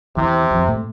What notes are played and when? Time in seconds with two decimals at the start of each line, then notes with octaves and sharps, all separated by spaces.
0.17 E2 C3 E3
0.51 F2 F3
0.68 A2 A3